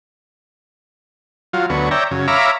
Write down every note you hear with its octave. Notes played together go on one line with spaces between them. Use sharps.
F#3 F4
D2 F#3 B3 C#6
C#5 D5 E5 G5 A#5
F#2 C#3
C#5 E5 F5 A#5 B5 D6